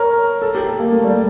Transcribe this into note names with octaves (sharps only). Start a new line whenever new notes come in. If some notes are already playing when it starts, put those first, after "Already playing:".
Already playing: A#4 C#5
A4
G4
A4
A#3
A3
G3